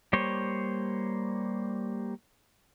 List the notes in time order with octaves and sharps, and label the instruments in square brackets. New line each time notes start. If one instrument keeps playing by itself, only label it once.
[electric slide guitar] G3 A#3 C5 C#5